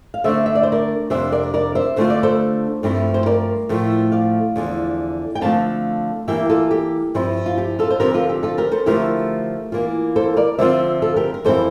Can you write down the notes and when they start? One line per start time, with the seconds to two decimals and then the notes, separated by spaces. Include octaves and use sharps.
0.14 F5
0.24 D3 A3 D4 C5 E5
0.46 E5
0.55 D5
0.63 C5
0.72 A#4 D5
1.10 F2 C3 G3 D4 C5 E5
1.32 A#4 D5
1.54 A#4 D5
1.75 C5 E5
1.96 D3 A3 D4 F4 C5
2.10 D5
2.23 A4 C5
2.83 G2 F3 A3 C4 E4
3.14 C5
3.26 A#4 D5
3.69 A2 F3 A3
4.12 D5 F5
4.56 E2 D3 F3
5.35 G5
5.41 D3 F3 A3 C4 F5 A5
6.28 E3 G3 A#3 E5 G5
6.49 F4 A4
6.71 G4
7.14 G2 F3 C4 E4
7.46 F4
7.58 G4
7.79 F4 A4
7.90 C5
8.00 D3 F3 C4 G4 A#4
8.14 F4 A4
8.29 G4
8.43 F4 A4
8.58 G4 A#4
8.72 A4 C5
8.86 D3 F3 A3 E4 G4 A#4
9.72 E3 A#3 F4
10.16 A4 C5
10.37 A#4 D5
10.58 D3 F3 C4 F4 C5 E5
11.02 F4 A4
11.16 G4 A#4
11.34 A#4
11.45 F2 E3 G3 C4 E4 A4 C5